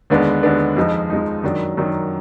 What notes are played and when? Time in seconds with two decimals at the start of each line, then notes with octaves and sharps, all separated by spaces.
0.10 D#2 D3 G#3 B3 D4
0.43 D#2 D3 G#3 B3 D4
0.77 F2 F3 G#3 D#4
1.10 F2 F3 G#3 D#4
1.43 F#2 D#3 F#3 D4
1.77 F#2 D#3 F#3 D4